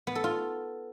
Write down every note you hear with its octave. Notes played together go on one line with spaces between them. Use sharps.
B3
A4
F4